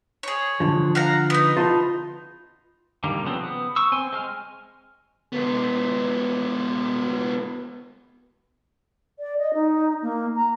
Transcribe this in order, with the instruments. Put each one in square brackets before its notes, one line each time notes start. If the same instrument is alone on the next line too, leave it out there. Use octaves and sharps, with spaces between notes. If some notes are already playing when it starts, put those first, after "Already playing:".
[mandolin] G#4 C#5
[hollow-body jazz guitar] D3 F3
[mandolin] F5 F#5 A#5
B3 D#4
[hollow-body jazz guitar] F4 A5 C6
[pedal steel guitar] D3 D#3 G3 A#3
C#3 F3 B3 C4
B3
C#6 E6
C4 C5 G#5
G#3 G#5 F6
[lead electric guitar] G#3 B3
[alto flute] D5
D#5
D#4
A#3
A#5